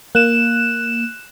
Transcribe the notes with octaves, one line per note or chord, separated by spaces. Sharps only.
A#3 F#6 E7